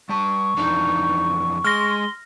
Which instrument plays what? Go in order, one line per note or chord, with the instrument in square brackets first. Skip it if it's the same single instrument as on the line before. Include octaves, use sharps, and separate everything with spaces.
[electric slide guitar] G3 A5 [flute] C#6
[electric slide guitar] F2 E3 D4 [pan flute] D#4
[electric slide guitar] G#3 [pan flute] C6 [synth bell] F6 A#6